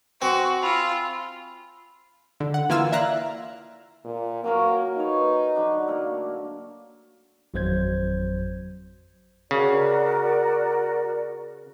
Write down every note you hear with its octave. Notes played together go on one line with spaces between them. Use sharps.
C4 F#4 G#5 C6
F4 B5 E6 F7
D3
F#5
E3 A#3 F4 G#5 E6 F6
D5 E5 F5 A#5 F#6 A#6
A#2
F#3 A#3 C#4 A#4
D#4 B4 C#5
D3 F#3 D4
A3 A#3 A4
G#1 F2 F#3 C5 G6 G#6
C#3 F#4 A#4 D5